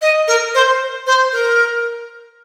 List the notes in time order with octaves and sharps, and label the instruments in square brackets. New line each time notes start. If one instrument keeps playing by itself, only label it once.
[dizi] D#5
A#4
C5
C5
A#4